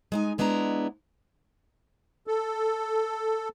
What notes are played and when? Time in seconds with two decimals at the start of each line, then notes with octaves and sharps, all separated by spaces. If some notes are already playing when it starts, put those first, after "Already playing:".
0.12 G#3 D#4 G#5
0.38 B2 G#3 B3 D4 E4 A#5
2.27 A4